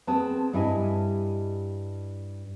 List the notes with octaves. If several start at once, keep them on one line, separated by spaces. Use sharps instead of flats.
B3 C4 G#4 A5
G2 G3 E4 D#5 G#5